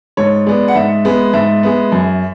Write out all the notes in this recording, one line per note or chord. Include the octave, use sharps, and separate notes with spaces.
G#2 C#5
G#3 B3 D5
F#5
G#2 E5
G#3 B3
G#2 E5
G#3 B3
F#2